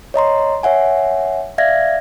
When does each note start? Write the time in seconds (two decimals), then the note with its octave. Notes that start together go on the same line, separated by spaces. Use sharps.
0.14 C#5 D#5 A#5 C6
0.63 C#5 E5 F#5 G#5
1.58 D5 E5 F5 G#6 A#6